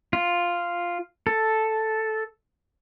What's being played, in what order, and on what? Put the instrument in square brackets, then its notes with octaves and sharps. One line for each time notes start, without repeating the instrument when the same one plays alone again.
[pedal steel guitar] F4
A4